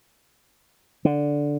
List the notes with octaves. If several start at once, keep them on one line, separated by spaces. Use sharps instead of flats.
D3